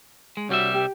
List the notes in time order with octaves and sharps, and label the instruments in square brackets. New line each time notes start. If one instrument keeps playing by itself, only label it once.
[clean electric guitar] G#3
[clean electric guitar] C2 G3 E5 [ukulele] D4 F#4 C#5
[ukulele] G4